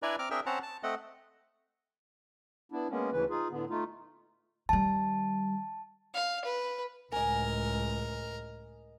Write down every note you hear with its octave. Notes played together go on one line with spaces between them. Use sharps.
D4 E4 B4 D5 G#5 A#5
C4 A#5 D6 F6
C4 D4 G#4 A#4 E5 G5
C4 C#4 C5 F#5 A5 A#5
A5
A3 C4 D#5 F#5
B3 D4 E4
G#3 A#3 B3 C#4
D2 C#3 E3 B4
D#4 F4 G#4
A2 D3 B3
A3 D#4 F4
D#3 G3 A5
F5
B4
C#2 A2 A#4 D#5 G#5